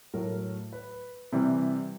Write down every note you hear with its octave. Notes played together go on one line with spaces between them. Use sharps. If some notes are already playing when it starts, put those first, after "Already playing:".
A2 F#3 A#4
B4
C3 E3 G3